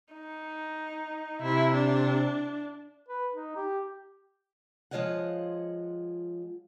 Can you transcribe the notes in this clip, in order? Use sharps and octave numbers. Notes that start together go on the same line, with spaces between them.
D#4
C3 E4
D4
B4
D#4
G4
F3 G#3 F4 C#5 D#5 F#5